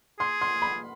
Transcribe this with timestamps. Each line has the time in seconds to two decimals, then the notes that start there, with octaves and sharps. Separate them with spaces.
0.19 G#4 C6
0.41 C6
0.62 B5